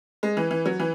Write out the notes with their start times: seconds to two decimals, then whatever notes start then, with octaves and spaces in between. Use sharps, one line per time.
0.23 G#3
0.37 E3
0.51 E3
0.66 F#3
0.80 E3